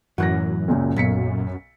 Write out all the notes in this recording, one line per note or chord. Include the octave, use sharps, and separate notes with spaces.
F#2 A2 E3 F#3 F#5 F#6 A#6
C#2 A#2 C#3
B1 A#2 B6 C#7